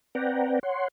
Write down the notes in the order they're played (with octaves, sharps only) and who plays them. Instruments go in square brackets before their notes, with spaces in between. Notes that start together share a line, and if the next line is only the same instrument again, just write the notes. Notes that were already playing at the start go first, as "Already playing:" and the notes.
[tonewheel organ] C4 B4 D5 F#5 G5 A#5
C#5 F#5 C6